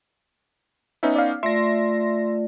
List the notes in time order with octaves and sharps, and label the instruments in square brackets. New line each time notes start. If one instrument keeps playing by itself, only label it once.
[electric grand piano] B3 C#4 D#4 [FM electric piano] B4 E5
[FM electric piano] D5 F5
[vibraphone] A3 F4 D5 [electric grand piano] E5 [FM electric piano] C6 A#6